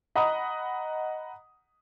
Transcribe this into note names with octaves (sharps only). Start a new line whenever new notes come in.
D#5 F#5 A#5 B5 D#6